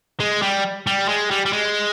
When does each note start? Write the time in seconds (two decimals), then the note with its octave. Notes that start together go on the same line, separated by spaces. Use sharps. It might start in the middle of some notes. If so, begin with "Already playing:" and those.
0.20 G#3
0.42 G3
0.87 G3
1.09 G#3
1.31 G3
1.46 G3
1.53 G#3